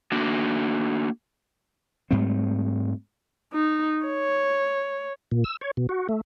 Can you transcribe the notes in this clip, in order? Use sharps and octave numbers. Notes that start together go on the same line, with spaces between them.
A3 A#3 D4 F#4
G#2 G3 A3 C4
D#4
C#5
A#2
E6
C#5
B2
F#4
A3